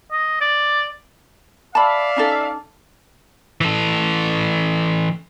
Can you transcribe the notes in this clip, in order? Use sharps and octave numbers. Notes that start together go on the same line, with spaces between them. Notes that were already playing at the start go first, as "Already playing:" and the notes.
D#5
D5
D5 E5 F5 A5 B5
C#4 D#4 A4
E3 A4